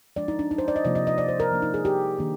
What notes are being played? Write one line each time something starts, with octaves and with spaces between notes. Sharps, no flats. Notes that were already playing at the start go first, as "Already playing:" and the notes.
F3 G#3 D4 D5
D#4
D4
D#4
C5
D5
D#5
C3 F3 A#3 D5
D#5
D#5
D5
C5
A#4
F3 A#3 D4
D#4
G#4
G4
D#3 A#3 D4